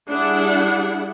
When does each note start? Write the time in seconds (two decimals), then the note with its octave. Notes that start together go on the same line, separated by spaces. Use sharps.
0.10 G3 D4 E4 G#4 F#5